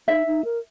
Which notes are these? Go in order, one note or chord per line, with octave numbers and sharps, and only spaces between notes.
D#4 E5
D#4
A#4